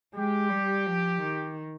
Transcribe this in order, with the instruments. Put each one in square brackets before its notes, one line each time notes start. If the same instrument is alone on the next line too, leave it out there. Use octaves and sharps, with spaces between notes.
[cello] G#3 [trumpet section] G4
[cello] G3
F3
D#3